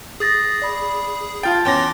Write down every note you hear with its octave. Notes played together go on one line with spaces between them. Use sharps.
G#4 D#6 A6 A#6
D5 B5
F4 G5 A5 A6
E2 C#4 G5 C6 D6 A#6